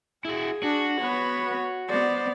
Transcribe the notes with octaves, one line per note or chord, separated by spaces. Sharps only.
E4 F#4 G#4
D4 F#4
B3 B4 C#5
B3 C5 D5